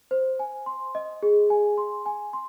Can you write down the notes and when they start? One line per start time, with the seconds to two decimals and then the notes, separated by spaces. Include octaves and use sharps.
0.11 C5
0.39 G#5
0.66 C6
0.95 D#5
1.23 G#4
1.50 G#5
1.78 C6
2.06 G#5
2.33 C6